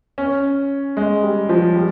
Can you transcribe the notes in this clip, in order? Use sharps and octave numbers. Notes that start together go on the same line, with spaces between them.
C#4
G#3
G3
F3
G3